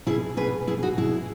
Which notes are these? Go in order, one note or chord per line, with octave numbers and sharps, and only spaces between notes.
B2 E4 G#4
B2 G#4 B4
B2 E4 G#4
D#4 F#4
B2 E4 G#4